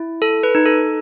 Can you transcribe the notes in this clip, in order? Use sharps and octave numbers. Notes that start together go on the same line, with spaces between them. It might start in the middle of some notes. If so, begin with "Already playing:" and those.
Already playing: E4
A4
B4
D#4
A4